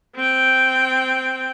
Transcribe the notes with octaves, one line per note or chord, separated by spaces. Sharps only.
C4 G5